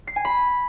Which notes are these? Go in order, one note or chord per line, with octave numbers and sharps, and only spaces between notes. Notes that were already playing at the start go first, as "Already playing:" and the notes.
C7
G#5
B5